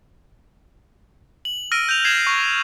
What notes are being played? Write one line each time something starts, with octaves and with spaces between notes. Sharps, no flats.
F#7
E6 F6 A#6 D7 D#7
G6 F7
G#6 C7 E7 F#7
C#6